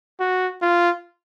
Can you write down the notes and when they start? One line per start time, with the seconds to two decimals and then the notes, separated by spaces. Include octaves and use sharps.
0.20 F#4
0.62 F4